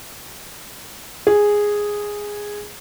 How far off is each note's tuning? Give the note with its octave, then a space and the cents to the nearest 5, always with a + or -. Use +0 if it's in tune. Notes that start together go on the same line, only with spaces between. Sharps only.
G#4 -5